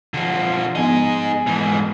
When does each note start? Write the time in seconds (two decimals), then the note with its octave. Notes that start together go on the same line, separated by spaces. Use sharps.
0.14 D3 F3
0.75 F3 B3 D#4 G#4
1.47 G#2 E3